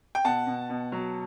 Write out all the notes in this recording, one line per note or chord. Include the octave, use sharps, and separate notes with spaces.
G5
B2 F#5 A5
B2
B2
F#3